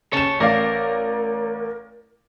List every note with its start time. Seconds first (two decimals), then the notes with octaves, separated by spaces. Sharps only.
0.13 C#3 C#5 A5 E7
0.40 A1 A#4 D5 F5